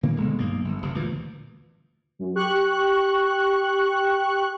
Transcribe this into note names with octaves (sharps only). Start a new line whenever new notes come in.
A#2 D#3 A#3 C4
G1 B2 D3 G#3
B1 G2 A#3
G1
F#1 C3
D2 A#2 E3
F#2
G4 C#6 F#6